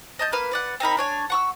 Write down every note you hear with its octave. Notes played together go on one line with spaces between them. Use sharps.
D#5 A5 G6
A#3 B4 F6
B4 D5 F#5
C4 D#4 A#4 B5
D4 C#5 G#5
F#5 C#6 E6